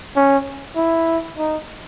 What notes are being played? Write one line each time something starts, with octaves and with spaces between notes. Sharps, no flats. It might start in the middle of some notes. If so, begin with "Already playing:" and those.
C#4
E4
D#4